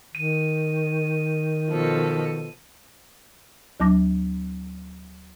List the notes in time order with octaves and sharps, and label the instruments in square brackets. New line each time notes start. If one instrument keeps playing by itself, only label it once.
[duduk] D#3 [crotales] D#7
[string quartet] B2 F3 A4
[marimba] D2 F#3 D4 A5 D6 A#6